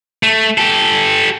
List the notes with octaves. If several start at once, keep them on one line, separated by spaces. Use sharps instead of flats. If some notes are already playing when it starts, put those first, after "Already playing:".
A3
G4 A4